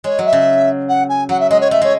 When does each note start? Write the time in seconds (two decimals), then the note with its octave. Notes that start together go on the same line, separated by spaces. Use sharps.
0.04 G#3 C#5
0.19 F#3
0.25 E5
0.33 C#3
0.88 F#5
1.09 G#5
1.29 F#3 F#5
1.40 E5
1.50 G#3 D#5
1.61 C#5
1.71 A3 E5
1.82 G#3 C#5